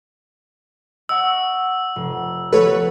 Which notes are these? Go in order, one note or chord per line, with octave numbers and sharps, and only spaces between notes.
D#5 F#5 C#6 E6
F1
F3 A3 B3 A4 B4 C#5